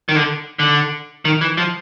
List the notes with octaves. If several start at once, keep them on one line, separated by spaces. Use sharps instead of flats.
D#3
D3
D3
D#3
E3
F3